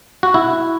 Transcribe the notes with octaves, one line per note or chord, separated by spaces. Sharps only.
F#4
E4